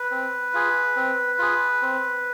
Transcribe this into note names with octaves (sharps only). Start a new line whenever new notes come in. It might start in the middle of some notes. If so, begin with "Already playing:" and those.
Already playing: B4
C4
F4 G#4
C4
F4 G#4
C4